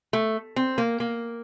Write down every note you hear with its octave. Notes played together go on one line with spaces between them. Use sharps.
A3
C4
A#3
A#3